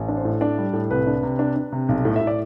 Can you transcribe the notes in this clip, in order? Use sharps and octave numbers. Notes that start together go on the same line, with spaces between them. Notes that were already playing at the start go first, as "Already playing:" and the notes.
Already playing: A1
D4
C5
A2
D4 D5
G3
A2
C2 B4
D4
C3
D4
D4
C3
B1
A2
E5
A2
D5